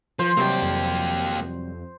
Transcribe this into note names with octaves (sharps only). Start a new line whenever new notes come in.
F3 C5
C3 F#3 G3 A#3 G4
F2